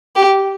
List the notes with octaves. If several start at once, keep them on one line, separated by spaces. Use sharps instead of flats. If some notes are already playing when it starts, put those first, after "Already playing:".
G4